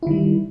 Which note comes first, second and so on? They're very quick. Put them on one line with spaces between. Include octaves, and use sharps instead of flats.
E4 D#3 G3